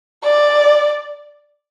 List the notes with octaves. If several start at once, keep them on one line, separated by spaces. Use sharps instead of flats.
D5